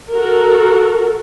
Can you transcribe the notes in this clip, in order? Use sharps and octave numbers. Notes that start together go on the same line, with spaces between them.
F#4 A4 A#4